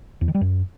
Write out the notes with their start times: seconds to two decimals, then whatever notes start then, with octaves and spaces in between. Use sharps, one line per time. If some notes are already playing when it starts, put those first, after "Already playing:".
0.21 E2
0.28 D#3
0.35 G3
0.41 F#2